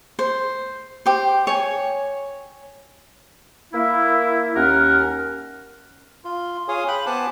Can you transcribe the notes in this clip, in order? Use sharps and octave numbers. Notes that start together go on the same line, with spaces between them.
C5
G4 C5
C#5 G#5
A#3 E4
D#2 C#4 A#4 F#5 F6
F4
F4 G#4 C#5 F5 G#5 D#6
G5 B5 F#6
B3 C5 F#5 G#5 A5 D6